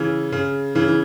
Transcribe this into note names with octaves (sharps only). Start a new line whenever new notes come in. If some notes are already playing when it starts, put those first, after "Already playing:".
Already playing: C#3 E3
C#3
C#3 E3
E3